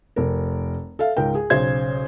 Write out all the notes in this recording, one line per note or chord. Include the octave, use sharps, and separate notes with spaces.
F1 A#4
A4 E5 F5
C#2 G#2 A#4 G5
G#4
B1 C#3 C5 G#6